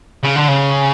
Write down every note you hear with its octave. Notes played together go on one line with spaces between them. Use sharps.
C#3
D3
C#3